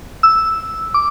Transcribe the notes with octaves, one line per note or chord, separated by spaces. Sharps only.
E6
D6